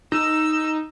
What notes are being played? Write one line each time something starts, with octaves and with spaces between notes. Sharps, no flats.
D#4 E6